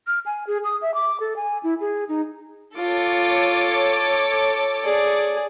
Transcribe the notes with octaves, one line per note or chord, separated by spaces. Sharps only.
F6
G#5
G#4
D#6
E5
D6
A4
G#5
E4
G#4
D#4
F4 A4 C#5 D6
G#4 D5